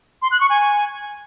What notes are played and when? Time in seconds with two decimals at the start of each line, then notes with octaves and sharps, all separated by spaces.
0.22 C6
0.31 F#6
0.40 C#6
0.50 G#5